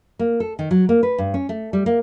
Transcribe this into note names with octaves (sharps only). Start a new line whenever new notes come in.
A#3
A4
D#3
F#3
A#3
B4
G2
C#4
A3
G3
A#3